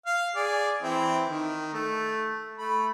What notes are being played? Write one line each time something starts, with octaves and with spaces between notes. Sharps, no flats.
F5
G#4 D5
E3 C4 E4
D#3
A3
A3 B5